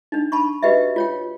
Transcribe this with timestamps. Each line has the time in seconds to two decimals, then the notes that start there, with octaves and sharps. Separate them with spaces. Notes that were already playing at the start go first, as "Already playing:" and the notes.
0.12 D4 D#4
0.32 A5 B5 C#6
0.63 F#4 G4 B4 D#5 E5
0.96 F4 C#5 G5